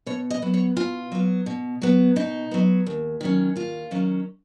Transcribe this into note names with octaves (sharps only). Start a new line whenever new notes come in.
B2 C#5
D#5
F#3 B3
C#5
B2 F4
F#3 B3
B2
F#3 B3
B2 D#4
F#3 B3
D#2
D#3 F#3 C#4
D#2 F4
D#3 F#3 C#4